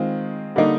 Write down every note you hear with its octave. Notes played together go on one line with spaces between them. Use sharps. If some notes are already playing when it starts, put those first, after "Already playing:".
Already playing: D#3 G#3 C4 F4
D3 G3 A#3 D#4